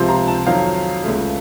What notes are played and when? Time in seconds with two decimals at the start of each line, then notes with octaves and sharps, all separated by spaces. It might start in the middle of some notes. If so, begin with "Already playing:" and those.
Already playing: C#2 C3 F3 C6
0.09 A#5
0.28 A5
0.47 F2 D#3 F#3 F5
1.04 C#2 C#3 A3